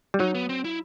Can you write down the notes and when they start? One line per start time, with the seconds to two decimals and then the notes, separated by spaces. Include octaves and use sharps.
0.14 G3
0.19 F#3 D#4
0.35 B3
0.49 C4
0.64 E4